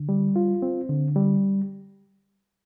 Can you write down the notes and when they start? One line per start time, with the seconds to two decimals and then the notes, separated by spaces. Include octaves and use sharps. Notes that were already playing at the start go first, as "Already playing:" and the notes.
Already playing: D3
0.09 G3
0.36 F4
0.62 C4
0.89 D3
1.16 G3